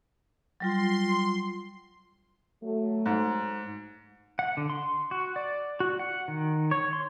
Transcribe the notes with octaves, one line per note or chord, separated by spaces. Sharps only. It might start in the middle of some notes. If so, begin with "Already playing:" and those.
F#3 G3 F4 C6
F#3 A3
G#2
F#5
D3
C6
F#4
D5
F#4
F#5
D#3
C#5
C6